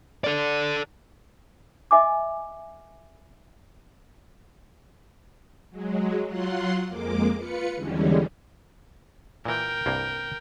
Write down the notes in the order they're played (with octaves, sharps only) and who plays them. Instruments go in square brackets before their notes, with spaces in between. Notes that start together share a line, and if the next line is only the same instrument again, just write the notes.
[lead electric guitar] A4 D5
[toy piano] D#5 E5 G#5 D6
[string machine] F#3 G#3
F#3 F4 F#5 C6
F2 G#3 A#3 D6
F4 B4 C#7
E2 D3 E3 G3 G#3 C#4
[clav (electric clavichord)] A#2 E3 [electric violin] A#4 G5
[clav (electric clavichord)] C2 G2 A#3